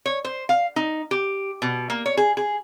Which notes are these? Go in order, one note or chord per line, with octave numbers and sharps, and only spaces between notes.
C#5
C5
F5
D#4
G4
B2
A#3
C#5
G#4
G#4